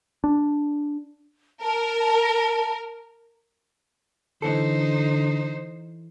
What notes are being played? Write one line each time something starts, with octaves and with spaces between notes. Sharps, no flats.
D4
A#4 A5
D3 E3 D#4 A4 C5